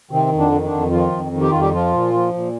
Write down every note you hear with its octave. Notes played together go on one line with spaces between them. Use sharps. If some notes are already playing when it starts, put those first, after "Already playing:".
C3 D#3 C4
F2
D3 D4
D#3
D3 D4
F2
D#3 F3 F4
F2
D#3
G4
F2 F4
G3 G4
F3 F4
A#2
F3
A#2